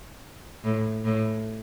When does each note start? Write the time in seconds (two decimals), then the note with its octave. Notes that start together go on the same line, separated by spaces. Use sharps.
0.64 A2
1.04 A2